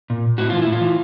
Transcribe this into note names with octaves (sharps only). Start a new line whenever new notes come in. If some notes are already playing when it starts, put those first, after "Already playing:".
A#2
A2 F#4
E3 F4
E4
A2
F4
E3